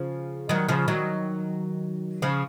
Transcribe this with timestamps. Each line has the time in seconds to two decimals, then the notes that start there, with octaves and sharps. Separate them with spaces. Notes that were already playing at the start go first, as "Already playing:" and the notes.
Already playing: C#3 F3
0.49 D#3 F#3
0.68 C#3 F3
0.88 D#3 F#3
2.22 C#3 F3